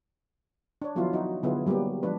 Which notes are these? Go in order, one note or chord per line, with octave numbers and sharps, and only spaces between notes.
D4 C#5
D#3 F3 F#3 B3 E4 F4
D#4 F#4
D3 F#3 B3 E4 F4 G#4
F#3 G3 A#3 B3 G4
F3 G#3 A3 D4 B4 C#5